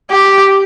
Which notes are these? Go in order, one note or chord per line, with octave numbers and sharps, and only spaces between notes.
G4